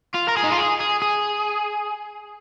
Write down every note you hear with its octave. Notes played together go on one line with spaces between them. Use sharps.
F4
A#4
G#4
D#4
F4
G#4
G#4
G#4